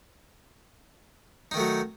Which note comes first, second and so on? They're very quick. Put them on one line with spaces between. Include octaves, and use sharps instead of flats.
D#4 D#3 A3 F#3